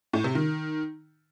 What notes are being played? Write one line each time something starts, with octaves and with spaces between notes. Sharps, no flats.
A2
C3
D#3